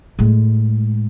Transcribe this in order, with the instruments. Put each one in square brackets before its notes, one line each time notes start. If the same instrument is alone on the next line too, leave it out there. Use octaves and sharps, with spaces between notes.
[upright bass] A2 G#3